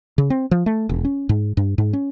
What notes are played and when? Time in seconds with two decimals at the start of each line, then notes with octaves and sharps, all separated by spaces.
0.18 C#3
0.30 C4
0.51 F3
0.66 A3
0.89 E1
1.05 C#4
1.29 G#2
1.57 G2
1.78 G#2
1.93 C#4